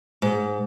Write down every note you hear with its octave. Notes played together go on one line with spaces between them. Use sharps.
G#2